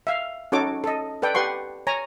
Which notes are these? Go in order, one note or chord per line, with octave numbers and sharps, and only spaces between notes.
E5 F5
C#4 D#4 F#4 A4 C#5 D6
A4 D#5
A4 B4 D5 G5
G4 B4 F#5 C6 C#6
C#5 G#5 A#5